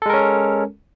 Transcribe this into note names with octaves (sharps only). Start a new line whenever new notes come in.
G#3 C#4 A4 A#4